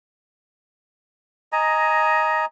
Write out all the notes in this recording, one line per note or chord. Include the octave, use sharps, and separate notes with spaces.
D#5 G#5 A#5